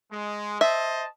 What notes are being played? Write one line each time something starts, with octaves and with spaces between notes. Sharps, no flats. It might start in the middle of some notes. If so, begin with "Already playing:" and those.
G#3
C5 D#5 E5 A5